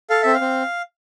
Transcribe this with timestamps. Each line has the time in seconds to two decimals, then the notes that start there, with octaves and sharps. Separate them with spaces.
0.10 A4 F5
0.22 C4 E5
0.33 F5
0.41 C4